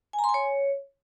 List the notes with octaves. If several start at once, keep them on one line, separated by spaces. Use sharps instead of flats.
G#5
A#5
C6
G#5
C#5